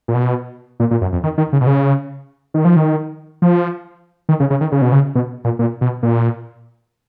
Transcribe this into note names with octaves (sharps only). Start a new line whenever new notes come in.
A#2
B2
A#2
A#2
F#2
F2
D#3
D#3
C#3
B2
C#3
D#3
F3
D#3
F3
D#3
C#3
C#3
D#3
C#3
B2
C#3
B2
A#2
A#2
B2
A#2